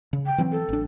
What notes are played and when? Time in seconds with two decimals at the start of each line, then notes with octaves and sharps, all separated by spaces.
0.13 C#3
0.26 G5
0.38 E3 F#3 C4
0.52 A4
0.69 A1 D4